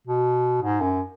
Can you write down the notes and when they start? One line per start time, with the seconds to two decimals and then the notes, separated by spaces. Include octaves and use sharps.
0.07 B2
0.62 G#2
0.81 F#2